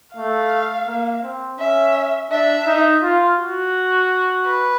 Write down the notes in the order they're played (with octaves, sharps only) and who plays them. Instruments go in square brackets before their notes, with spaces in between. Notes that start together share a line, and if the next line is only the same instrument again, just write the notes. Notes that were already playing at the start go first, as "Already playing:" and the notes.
[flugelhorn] A3 [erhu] F5
[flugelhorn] A#3
C4
[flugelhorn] C#4 [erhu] E5
[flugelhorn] D4 [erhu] E5
[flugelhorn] D#4
F4
F#4
[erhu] B4